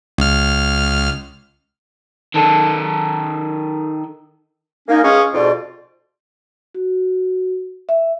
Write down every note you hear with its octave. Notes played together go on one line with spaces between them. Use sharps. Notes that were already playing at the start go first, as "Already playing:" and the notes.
C#2 F6
D#3 A4
A#3 C#4 D#4
C#2 G#3 C#4 F5 C#6 D#6
F2 G#2 B2 F4 D5
F#4
E5